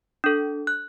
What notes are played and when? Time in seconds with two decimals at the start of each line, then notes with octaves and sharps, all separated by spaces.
0.24 D4 A4
0.67 F#6